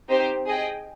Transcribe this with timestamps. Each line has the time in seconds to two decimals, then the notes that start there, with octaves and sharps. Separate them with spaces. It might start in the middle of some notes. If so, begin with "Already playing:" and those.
0.09 C4 D#4 G4 C5
0.46 G#4 D#5 G5